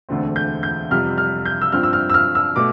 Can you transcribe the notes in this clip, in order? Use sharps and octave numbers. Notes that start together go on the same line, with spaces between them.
E1 D2 D3 A3 C4
G6
G6
F2 C3 G3 F6
F6
G6
E6
G2 F3 C4 F6
E6
F6
E6
F6
E6
B2 A3 D6